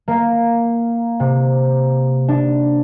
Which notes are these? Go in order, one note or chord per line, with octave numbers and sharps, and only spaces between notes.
A#3
C3
D4